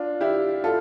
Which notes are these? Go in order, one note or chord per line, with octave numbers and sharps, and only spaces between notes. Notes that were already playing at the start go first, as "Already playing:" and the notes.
Already playing: D4 F4
E4 G4
F4 A4